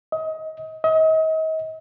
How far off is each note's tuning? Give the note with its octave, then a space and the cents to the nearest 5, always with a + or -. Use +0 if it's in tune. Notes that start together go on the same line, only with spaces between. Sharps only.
D#5 +30
D#5 +40